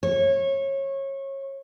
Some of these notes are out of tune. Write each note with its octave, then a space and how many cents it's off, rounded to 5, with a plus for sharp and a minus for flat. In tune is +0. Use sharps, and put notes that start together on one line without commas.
C#5 -25